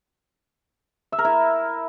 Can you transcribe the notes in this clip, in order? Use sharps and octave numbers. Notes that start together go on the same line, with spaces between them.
E5
A#4
E4